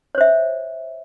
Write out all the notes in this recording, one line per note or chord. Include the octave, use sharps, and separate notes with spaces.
C5 C#5 E5